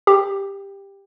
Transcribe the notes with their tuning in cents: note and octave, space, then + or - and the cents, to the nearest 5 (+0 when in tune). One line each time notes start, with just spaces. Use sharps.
G4 +10